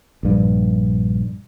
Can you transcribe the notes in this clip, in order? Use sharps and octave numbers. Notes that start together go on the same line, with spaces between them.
A#1 G2